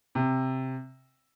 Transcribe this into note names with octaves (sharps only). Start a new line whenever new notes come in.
C3